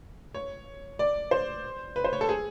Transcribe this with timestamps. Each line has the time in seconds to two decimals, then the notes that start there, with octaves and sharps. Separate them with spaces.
0.34 C#5
0.99 D5
1.31 C5
1.96 B4
2.04 C5
2.13 C#5
2.21 A4
2.29 G#4